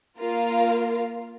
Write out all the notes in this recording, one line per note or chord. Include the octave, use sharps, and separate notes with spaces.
A#3 F4 A#4 F5